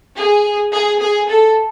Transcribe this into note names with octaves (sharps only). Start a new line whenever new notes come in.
G#4
G#4
G#4
A4